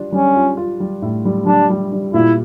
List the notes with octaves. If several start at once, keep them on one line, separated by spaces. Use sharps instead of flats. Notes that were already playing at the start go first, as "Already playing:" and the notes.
Already playing: G3 D4 F4
G3 C#4
F4
F4
G3
A2
G3
G3 D4
G3
G3
A#2 E4